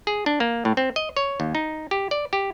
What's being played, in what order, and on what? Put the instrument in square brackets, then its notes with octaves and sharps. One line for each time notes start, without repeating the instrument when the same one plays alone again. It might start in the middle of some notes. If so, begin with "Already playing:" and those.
[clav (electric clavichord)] G#4
D4
A#3
A2
C4
D#5
C#5
D#2
D#4
G4
D5
G4